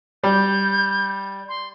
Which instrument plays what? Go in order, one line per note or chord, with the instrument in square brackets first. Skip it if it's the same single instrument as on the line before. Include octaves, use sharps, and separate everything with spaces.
[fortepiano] G3 [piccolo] G6
[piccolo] C6